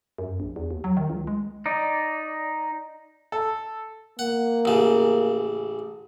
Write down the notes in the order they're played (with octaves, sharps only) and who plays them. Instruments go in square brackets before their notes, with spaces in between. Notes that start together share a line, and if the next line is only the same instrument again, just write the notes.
[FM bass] F#2
A#1
E2
D#2
F#3
D#3
C#2
G#3
[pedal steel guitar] D#4 D5
[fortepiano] A4
[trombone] A#3 [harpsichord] F#5
[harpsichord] A1 C#3